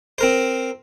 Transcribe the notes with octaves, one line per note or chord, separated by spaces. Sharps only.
C4 A#4 C5